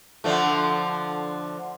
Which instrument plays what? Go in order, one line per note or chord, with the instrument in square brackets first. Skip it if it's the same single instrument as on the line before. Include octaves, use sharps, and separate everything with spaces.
[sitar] D3 F3 A3